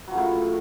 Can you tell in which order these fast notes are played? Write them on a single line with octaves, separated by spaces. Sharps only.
F#3 F3 C#3 A2